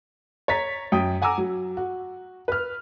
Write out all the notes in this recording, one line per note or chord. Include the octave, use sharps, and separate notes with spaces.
C#5 A#5 A6 B6
F#2 G5 D#6
F#5 G#5 A#5 D6 E6
F#3
F#4
B4 F6